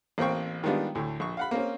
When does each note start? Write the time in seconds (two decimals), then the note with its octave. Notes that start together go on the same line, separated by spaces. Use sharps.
0.18 A1 A#3 C4 G5 C#6
0.64 D#3 G3 G#3 B3 D4 F4
0.95 D2 A2
1.20 A#1 C#6
1.37 F5 F#5 B5
1.51 A#3 C4 C#4